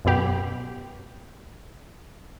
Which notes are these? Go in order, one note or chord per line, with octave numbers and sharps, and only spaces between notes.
F#2 B2 B3 G4